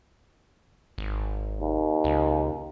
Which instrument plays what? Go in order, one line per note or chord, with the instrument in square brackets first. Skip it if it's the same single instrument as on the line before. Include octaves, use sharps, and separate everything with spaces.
[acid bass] G#1
[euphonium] D#2
[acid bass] C#2